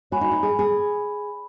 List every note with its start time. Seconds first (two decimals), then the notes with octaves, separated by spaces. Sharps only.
0.12 F#4 C#5 G#5 B5
0.21 D#4
0.31 D#4
0.43 G#4
0.59 G#4